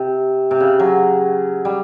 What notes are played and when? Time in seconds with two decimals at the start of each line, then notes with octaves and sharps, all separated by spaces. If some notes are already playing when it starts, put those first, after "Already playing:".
Already playing: C3
0.51 C3
0.60 C#3
0.80 F#3
1.65 G3